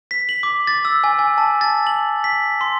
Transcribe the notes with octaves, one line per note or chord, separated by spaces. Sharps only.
B6
F#7
D6
A6
E6
G#5
G#5
A5
A6
F#7
B6
C6